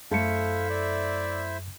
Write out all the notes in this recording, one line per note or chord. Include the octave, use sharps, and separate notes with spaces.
F#2 A3 E4 A4 C5 E5 F5 C#7
D5